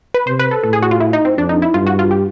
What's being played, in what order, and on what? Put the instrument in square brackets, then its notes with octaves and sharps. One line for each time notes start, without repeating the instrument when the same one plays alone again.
[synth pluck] B4
[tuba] C3 [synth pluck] C5
[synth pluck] B4
A4
[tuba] A2 [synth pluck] A4
[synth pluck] G#4
F#4
F4
E4
D#4
C4
[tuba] F2 [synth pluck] D4
[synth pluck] D#4
E4
[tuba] G2 [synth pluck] F4
[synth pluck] F#4
F4
G4